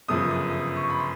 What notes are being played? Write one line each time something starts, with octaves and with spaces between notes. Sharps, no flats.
G1 F#2 C#3 F3 D#6
D#6
C#6
B5
C6